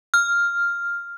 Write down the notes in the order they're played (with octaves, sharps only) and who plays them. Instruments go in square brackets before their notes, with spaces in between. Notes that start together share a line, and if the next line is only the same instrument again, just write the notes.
[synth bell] F6